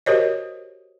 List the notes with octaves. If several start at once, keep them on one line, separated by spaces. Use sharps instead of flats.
F#4 G4 A#4 C5 C#5 D#5